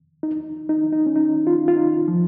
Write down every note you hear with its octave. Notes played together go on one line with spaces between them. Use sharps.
D#4
D#4
D#4
C#4
D#4
F4
F4
D#4
F3